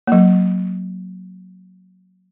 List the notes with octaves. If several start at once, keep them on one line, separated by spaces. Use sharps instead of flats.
F#3 A#3